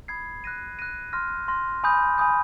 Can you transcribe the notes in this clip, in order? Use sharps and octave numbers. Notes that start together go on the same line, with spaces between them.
B5 D#6 G#6 C7
F#6 A#6 D#7
F#6 A#6 D#7
C6 F6 A#6
C6 F6 A#6
G#5 B5 D#6 G6
G#5 B5 D#6 G6